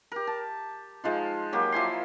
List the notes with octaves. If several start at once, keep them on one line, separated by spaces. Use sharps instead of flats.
G4 A#4
A5
F3 G#3 D#4 F4
F#3 A#3 G4
F3 E4 G#5 C6